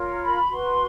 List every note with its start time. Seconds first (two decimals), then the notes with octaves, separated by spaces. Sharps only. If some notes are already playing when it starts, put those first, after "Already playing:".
Already playing: F4 A#4 C#5
0.20 B5
0.41 C#6
0.49 F#4 B4 C6